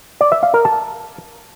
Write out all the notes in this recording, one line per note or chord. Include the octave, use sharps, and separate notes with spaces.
D5
E5
F5
A#4
A5